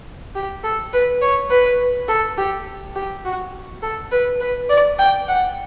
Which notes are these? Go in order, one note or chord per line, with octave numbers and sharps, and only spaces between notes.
G4
A4
B4
C#5
B4
A4
G4
G4
F#4
A4
B4
B4
D5
G5
F#5